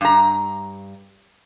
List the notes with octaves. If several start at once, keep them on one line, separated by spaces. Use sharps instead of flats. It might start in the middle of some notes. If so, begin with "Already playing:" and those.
G2 A#5